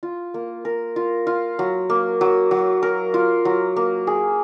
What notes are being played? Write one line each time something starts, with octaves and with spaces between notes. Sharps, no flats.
F4
A#3
A#4
F4
F4
F#3
A#3
F#3
F#3
A#4
F4
F#3
A#3
G#4